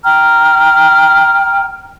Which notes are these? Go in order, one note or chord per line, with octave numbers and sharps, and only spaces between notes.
G5 A#5 F6